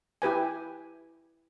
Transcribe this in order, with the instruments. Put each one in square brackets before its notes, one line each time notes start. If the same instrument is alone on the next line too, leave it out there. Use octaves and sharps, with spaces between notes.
[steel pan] E4 G4 B4 G#5